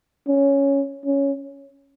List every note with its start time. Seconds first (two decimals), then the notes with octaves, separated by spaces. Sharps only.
0.28 C#4
1.05 C#4